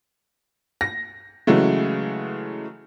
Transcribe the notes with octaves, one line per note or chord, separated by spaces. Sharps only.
A#6
C#3 E3 F#3 G#3 A3